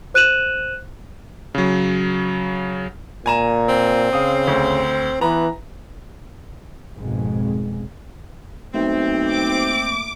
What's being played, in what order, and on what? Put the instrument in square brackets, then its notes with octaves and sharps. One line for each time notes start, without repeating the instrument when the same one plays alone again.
[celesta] C5 F#6 D#7 E7 F#7
[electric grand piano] C#3 F#3
[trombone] A#2 [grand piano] G#5 A#5 E7
[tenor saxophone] C4
[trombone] C#3 [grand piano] F5 D#6
[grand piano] D2
[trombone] E3 [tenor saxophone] B3 [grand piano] A#5
[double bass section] G#1 F2 G#2 B2 G#3
[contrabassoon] B1 [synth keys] A3 A#3 E5 [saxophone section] C4
[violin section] D6